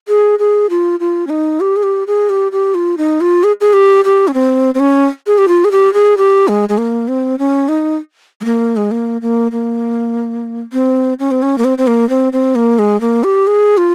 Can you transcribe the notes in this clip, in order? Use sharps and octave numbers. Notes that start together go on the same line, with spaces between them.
G#4
G#4
F4
F4
C#4
D#4
G4
G#4
G4
G#4
G4
G4
F4
D#4
F4
G#4
G#4
G4
G4
C#4
C4
C4
C#4
G#4
G4
F4
G#4
G4
G#4
G4
G#3
G#3
A#3
C4
C#4
D#4
G#3
A#3
G#3
A#3
A#3
A#3
C4
C#4
C4
C#4
A#3
C4
C4
A#3
C4
C4
A#3
G#3
A#3
G4
G#4
F4